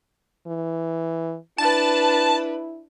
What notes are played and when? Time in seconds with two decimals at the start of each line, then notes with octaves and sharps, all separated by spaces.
0.47 E3
1.58 D4 E4 B4 A5